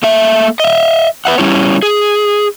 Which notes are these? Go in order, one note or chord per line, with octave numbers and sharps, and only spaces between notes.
A3 A#3 E5
D#5 E5
B4 E5 F#5
G3 C#4 E4 C#5
G#4